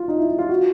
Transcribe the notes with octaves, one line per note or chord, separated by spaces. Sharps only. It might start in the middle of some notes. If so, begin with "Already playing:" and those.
Already playing: F4
D#4
E4
E4
F4
F#4